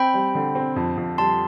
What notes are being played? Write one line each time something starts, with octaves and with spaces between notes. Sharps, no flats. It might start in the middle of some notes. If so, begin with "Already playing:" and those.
Already playing: C4 G5 B5
G3
D3
C4
F2
F2
G3 A5 C6